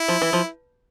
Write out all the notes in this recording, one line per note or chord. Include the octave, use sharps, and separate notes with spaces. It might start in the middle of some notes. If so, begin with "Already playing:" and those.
Already playing: E4
F3
E3
F3